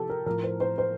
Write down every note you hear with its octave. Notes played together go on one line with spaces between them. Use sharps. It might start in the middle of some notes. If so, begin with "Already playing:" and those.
Already playing: C3 F3 G4 A4
A#4
A2 F3 A#4
C5
C5
C5